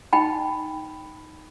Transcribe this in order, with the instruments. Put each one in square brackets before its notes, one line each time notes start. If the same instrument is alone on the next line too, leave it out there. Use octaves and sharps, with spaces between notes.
[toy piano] D#4 G5 B5